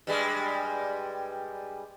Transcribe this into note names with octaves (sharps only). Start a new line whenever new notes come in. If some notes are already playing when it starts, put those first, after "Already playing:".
G2 G3 G#3